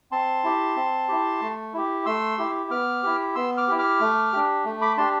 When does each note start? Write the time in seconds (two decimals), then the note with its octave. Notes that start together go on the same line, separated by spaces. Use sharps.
0.12 C4 A5 C6
0.44 E4 G4
0.76 C4
1.08 E4 G4
1.41 A3
1.73 E4 G4
2.06 A3 C6 E6
2.38 E4 G4
2.70 B3 D6 F6
3.03 E4 G4
3.35 B3 C6 E6
3.57 D6 F6
3.68 E4 G4
3.78 D6 F6
4.00 A3
4.33 D4 G4
4.65 A3
4.81 B5 D6
4.97 D4 G4 A5 C6